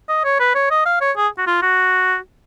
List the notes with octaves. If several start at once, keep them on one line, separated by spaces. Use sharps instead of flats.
D#5
C#5
B4
C#5
D#5
F5
C#5
G#4
F#4
F4
F#4